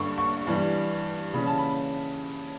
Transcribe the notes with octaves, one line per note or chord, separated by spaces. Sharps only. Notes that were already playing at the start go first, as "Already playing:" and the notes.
Already playing: G2 D3 G3 C#6
C#6
G2 E3 G3
C#3 E3 G3 C#4 B5
A5
B5